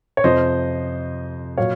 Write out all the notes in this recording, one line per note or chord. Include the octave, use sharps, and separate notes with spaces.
C#5
F2 C3 F3 C5 D#5
A#2 F#3 C#5 F5